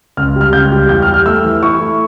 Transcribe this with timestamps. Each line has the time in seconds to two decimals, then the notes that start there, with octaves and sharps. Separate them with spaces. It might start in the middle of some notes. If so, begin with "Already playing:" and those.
0.17 C#2 F6
0.36 G3
0.41 F6
0.53 C#2 G6
0.72 G3
0.89 E2 G6
1.02 F6
1.08 G3
1.14 F6
1.26 A3 E6
1.44 E3
1.63 E4 C#6
1.80 A3